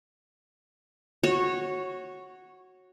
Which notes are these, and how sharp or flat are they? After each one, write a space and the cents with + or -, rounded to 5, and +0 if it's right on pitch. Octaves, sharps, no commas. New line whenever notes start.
F#4 +0 C#5 -15